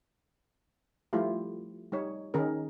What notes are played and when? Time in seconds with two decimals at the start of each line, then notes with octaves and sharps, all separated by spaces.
1.13 F3 G3 A3 E4 F4 G4
1.92 G3 D#4 C#5
2.34 D#3 C#4 D#4 G#4 A#4